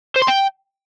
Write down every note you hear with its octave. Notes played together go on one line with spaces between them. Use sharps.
C5
C6
G5